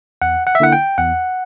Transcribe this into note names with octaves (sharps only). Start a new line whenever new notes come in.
E2 F#5
F#5
E5
D3 A#3 E4 F#5
G5
E2 F#5